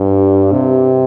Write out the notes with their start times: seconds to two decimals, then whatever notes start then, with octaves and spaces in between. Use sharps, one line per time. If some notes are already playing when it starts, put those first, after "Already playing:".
Already playing: G2
0.52 C3